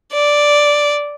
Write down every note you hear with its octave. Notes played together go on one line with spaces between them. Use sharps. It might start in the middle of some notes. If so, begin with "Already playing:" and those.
D5